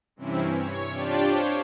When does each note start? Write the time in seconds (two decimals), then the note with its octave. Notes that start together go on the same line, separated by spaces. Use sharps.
0.16 G2 C3 E3 C4 C#4 E4
0.53 C#5
0.92 D4 F4 G4 D5 G5 A5
1.26 C5 C#5